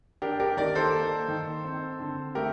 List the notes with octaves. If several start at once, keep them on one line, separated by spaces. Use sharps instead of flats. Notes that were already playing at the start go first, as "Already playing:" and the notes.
D4 G4 A#4
G4 A#4
D#3 A#4 D5
A4 C5
A#3
D#3
C4
D3
A3 G4 A#4